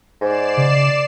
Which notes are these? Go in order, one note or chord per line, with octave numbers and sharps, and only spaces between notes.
G#2 D5 C7 E7
C#3